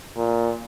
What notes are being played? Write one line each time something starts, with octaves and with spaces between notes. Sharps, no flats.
A#2